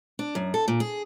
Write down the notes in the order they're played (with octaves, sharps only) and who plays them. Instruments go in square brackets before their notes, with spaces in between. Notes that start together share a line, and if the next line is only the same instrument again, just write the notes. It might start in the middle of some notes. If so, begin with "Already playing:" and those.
[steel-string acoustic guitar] D4
F#2
A4
A#2
G#4